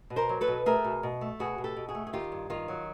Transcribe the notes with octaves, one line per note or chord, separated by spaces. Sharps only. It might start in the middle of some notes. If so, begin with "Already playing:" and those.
B2
A#4 C5
F#3
A4 B4
B2
A3 G#4 A#4
B2
B2
A3
B2 F#4 G#4
B2
G4 A4
B2
F#4 G#4
A3
G#4
D#3 F4 G4
G2
D#3 F4
F#3